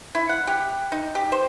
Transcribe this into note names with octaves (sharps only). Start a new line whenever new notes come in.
E4
F#5
G4
D#4
G4
C5